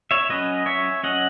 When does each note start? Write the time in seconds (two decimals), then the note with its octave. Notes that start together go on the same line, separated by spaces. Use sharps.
0.11 C#5 E5
0.29 F#3 C#4 B4 D#5
0.66 C#5 E5
1.03 F#3 C#4 D#5 F#5